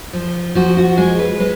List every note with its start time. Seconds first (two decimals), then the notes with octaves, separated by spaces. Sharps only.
0.13 F3
0.55 F3 F#4
0.77 F#4
0.97 G#3 G#4
1.19 B4
1.40 G#3 B4